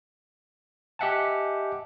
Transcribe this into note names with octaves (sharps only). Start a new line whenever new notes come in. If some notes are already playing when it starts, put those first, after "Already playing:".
G4 D#5 E5 F#5 G#5 A5